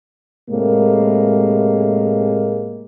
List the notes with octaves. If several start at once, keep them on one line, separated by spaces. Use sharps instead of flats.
A2 C3 G#3 A#3